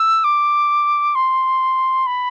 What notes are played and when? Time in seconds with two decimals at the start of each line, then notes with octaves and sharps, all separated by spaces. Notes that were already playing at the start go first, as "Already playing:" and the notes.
Already playing: E6
0.24 D6
1.15 C6
2.06 B5